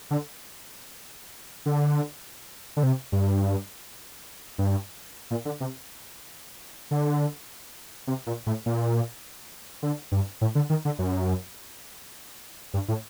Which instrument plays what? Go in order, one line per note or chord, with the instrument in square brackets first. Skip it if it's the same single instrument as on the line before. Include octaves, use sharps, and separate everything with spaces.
[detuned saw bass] D3
D3
D3
C3
G2
G2
A#2
D3
C3
D3
C3
A#2
A2
A#2
D3
G2
A2
D3
D#3
D3
F#2
G2
A2